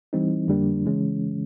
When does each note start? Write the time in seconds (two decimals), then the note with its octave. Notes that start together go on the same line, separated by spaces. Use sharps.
0.13 E3 G3 C4 D#4
0.48 F2 D3 G3 A#3 D4
0.85 C#3 E3 G#3 C#4